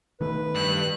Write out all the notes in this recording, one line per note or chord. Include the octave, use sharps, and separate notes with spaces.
D#3 A3 B4
G2 F#6